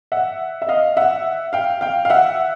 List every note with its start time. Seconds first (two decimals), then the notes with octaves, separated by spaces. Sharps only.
0.12 E5 F#5
0.62 E5
0.69 D#5 F5
0.97 E5 F#5
1.53 F5 G5
1.81 F5 G5
2.05 F5
2.10 E5 F#5